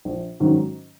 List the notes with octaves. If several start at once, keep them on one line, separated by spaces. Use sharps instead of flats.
A#1
G#2 D#3 F#3 C#4